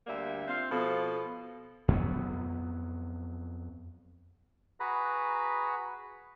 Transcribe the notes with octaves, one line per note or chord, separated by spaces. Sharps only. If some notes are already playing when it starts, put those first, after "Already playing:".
D2 G3 A#3 E5
C4 F4 F5
B2 F3 A4
F2 F#3 A#3 B3
F#4 G#4 B4 A#5 B5